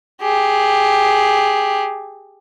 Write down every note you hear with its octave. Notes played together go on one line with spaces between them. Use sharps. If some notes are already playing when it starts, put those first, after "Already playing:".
G4 G#4